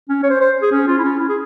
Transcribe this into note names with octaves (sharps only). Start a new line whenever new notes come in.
C#4
C#5
C5
C5
G#4
C#4
F4
E4
C#4
E4
G#4